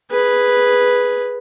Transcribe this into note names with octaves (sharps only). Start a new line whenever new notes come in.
G#4 B4